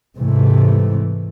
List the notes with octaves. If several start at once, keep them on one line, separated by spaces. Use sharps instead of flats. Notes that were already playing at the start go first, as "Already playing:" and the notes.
G#2 C3 E3 A3